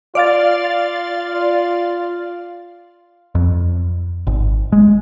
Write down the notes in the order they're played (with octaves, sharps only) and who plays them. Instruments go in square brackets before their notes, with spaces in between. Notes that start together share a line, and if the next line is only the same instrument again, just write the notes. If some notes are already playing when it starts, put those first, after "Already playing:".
[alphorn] F4 [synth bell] D5 F5 A6
[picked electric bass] F2
G#1
G#3